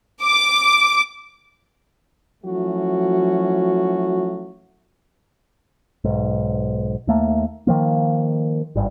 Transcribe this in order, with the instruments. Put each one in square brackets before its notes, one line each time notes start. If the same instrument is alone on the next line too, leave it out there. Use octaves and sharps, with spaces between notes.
[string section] D6
[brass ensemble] F3 F#3 A3 C#4 E4 F#4
[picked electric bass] B1 G#2
D#2 A3 A#3
D#3 F3 A#3
G#1 G2